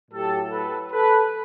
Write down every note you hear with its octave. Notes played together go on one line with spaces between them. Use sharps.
A2 F#3 G4 A4
A4 B4
A4 B4